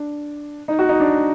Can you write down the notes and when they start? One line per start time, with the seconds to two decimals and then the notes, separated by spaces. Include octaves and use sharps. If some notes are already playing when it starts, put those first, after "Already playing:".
Already playing: D4
0.68 D#4
0.79 F#4
0.89 D#4
1.00 D4